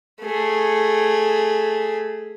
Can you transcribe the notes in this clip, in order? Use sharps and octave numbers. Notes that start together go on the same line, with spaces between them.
A3 G#4